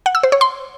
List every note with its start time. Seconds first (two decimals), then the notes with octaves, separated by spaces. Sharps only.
0.06 F#5
0.15 E6
0.23 C5
0.32 C#5
0.41 C6